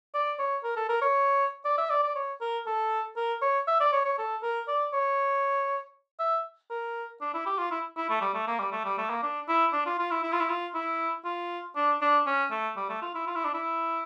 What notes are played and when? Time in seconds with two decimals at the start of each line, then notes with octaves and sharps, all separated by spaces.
0.14 D5
0.39 C#5
0.64 A#4
0.76 A4
0.89 A#4
1.02 C#5
1.65 D5
1.78 E5
1.90 D5
2.03 D5
2.16 C#5
2.41 A#4
2.66 A4
3.16 A#4
3.41 C#5
3.67 E5
3.80 D5
3.92 C#5
4.05 C#5
4.18 A4
4.43 A#4
4.68 D5
4.93 C#5
6.19 E5
6.70 A#4
7.21 D4
7.34 E4
7.46 G4
7.58 F4
7.71 E4
7.96 E4
8.10 A3
8.21 G3
8.34 A3
8.47 A#3
8.59 G3
8.72 A3
8.85 G3
8.98 A3
9.10 A#3
9.23 D4
9.48 E4
9.73 D4
9.86 F4
9.99 F4
10.11 E4
10.23 E4
10.32 F4
10.40 E4
10.49 F4
10.74 E4
11.25 F4
11.76 D4
12.01 D4
12.26 C#4
12.51 A3
12.76 G3
12.89 A3
13.02 F4
13.15 E4
13.27 F4
13.35 E4
13.44 D4
13.54 E4